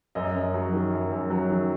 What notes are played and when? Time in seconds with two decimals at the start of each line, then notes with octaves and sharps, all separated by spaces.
0.15 F#2 D#5
0.35 F#2
0.54 F#3
0.73 D#3
0.92 F#2
1.12 F#2
1.30 F#3
1.49 D#3